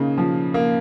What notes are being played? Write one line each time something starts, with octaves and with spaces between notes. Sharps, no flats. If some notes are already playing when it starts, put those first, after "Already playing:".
Already playing: C#3 A#3 D#4
F3
A#3